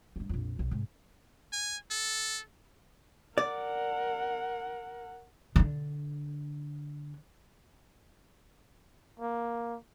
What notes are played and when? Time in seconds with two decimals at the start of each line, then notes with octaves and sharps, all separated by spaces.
0.16 G2 D#3
0.29 A#1 F2
0.59 B1
0.71 G#2 C3
1.53 G#5
1.90 A4
3.38 A#4 D5 F#5
5.56 D3 D4
9.20 A#3